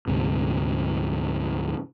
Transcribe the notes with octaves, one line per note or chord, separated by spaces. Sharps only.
D2 G#2 C3